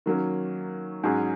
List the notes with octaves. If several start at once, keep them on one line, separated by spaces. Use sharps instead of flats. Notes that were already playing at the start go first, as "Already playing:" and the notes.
D#3 F#3 A#3 C#4
G#2 F#3 C#4 G#4